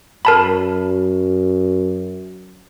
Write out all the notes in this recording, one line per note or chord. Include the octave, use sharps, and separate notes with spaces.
F#2 A#4 A5 B5